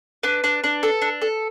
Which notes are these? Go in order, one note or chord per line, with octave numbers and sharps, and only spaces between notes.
D4 B4
D4
D4
A4
D4
A4